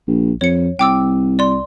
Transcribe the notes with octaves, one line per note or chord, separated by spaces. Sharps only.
A#1
F2 C#5 C#7
C2 G5 D6 E6
D5 C6